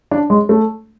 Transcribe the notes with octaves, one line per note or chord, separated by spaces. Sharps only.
D4
G#3
A3